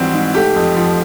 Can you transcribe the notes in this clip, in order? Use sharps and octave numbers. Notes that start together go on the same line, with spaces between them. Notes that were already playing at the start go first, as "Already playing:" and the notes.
Already playing: G#2 E3 G3 C4 F#4
G#2
A3 G4
F2
F3